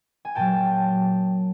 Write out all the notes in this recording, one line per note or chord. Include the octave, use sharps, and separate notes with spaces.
G#5
A#2 F#3 G5 A5